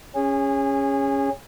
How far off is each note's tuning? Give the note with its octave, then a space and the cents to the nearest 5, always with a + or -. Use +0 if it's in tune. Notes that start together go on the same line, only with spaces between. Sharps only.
C#4 +0 G#4 -25